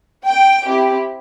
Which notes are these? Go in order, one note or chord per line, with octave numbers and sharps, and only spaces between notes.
G5
C4 E4 G4